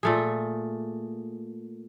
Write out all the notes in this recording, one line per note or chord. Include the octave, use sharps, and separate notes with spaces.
A#2 A3 G#4